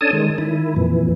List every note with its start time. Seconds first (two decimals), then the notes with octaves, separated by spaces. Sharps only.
0.01 C#4 D4 A4 G#5 A5 D#6
0.13 D#3 G#3
0.38 D#3 E4
0.76 F2 A#2 E3